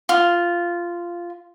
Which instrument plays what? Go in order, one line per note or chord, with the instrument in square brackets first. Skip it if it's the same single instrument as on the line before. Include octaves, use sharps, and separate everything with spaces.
[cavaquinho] F4